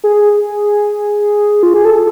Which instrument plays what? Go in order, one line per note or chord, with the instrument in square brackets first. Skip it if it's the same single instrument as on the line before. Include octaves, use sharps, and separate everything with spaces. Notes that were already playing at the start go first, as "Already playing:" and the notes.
[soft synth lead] G#4
F4
G#4
A4